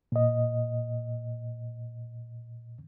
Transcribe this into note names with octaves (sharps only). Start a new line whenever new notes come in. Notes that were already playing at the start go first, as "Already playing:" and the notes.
A#2 D#5